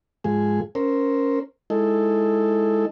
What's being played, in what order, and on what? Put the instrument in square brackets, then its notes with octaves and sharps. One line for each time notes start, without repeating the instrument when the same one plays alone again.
[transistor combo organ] G#2 F3 G#3 G#4
C#4 A#4 C5
G#3 D#4 E4 A4